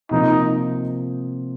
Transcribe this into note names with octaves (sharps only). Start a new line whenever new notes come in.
C3 F3 A#3 D#4